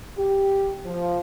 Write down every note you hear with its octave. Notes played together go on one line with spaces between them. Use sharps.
G4
F3